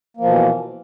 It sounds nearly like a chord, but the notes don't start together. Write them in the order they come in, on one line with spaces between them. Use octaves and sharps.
A#3 F3 B2 E3